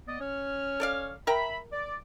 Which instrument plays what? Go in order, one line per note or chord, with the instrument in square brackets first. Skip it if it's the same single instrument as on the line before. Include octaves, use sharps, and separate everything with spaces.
[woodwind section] B3 D5 D#5
C#4 C#5 F6
[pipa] A4 D5 F5
[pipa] A#4 G5 A#5 [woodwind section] E5 B5
[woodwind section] D5